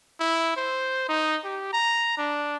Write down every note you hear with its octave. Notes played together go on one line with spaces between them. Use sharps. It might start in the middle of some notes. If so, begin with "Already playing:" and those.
E4
C5
D#4
G4
A#5
D4